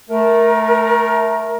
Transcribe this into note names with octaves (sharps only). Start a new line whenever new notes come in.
A3 A#4